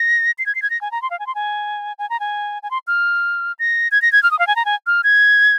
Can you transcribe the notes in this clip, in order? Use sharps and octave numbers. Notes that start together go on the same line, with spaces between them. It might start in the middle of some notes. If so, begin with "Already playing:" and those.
Already playing: A#6
C7
G#6
C7
G#6
A#6
G#5
A#5
C6
F5
G#5
C6
G#5
G#5
A#5
G#5
G#5
C6
F6
A#6
G#6
A#6
G#6
F6
D#6
F5
G#5
A#5
G#5
F6
G#6